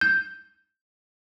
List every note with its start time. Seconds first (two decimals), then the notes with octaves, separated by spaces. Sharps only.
0.01 G6